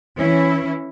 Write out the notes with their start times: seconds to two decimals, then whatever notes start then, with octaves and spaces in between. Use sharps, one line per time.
0.16 E3 C#4 E4